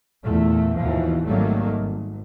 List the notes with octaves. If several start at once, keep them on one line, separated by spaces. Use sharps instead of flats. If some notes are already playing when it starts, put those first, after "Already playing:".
E2 A#2 E3 A3
D#2 G#2 B2 E3 F3
G#1 D#3 F#3 G3 A3 A#3
G#1